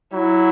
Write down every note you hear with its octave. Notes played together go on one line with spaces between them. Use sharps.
F#3 E4